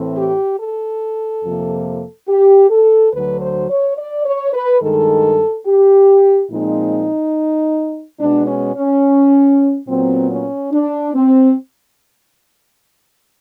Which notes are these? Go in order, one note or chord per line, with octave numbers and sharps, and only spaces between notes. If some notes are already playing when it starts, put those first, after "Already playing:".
Already playing: A2 E3 A3 C4
G4
A4
F2 C3 F3 A#3
G4
A4
D2 D3 F#3 B4
C5
C#5
D5
C#5
B4
G2 D#3 G#3 A4
G4
A#2 F3 G#3 C4 D#4
B2 G#3 B3 D4
C#4
C#4
A#2 F#3 B3 C4
C#4
D4
C4